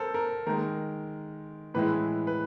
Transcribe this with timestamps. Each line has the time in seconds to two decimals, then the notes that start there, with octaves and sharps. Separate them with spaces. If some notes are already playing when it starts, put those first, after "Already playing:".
Already playing: A4 A#4 C5
0.14 A#4
0.47 D#3 G#3 A#4
1.74 A2 E3 G#3 B4
2.27 B4